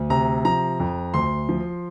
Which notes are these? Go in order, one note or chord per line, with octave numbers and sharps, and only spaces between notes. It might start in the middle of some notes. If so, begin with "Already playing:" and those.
Already playing: D2
C3 A#5
F3 A#5
F2
D2 C6
F3